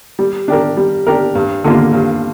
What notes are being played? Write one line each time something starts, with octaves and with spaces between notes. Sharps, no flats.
G3
D4 G4 A#4
G3
D4 G4 A#4
G2
D3 A#3 F4
G2